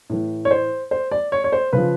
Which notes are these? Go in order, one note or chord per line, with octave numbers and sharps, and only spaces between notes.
A2 E3
C#5
C5
C5
D5
C#5
C#5
C5
C#3 F3 B4